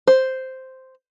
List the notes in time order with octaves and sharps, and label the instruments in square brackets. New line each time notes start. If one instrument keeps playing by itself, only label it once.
[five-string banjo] C5